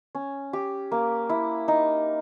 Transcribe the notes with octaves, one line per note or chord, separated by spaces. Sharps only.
C#4
G4
A#3
E4
D#4